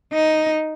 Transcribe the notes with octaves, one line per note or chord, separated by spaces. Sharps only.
D#4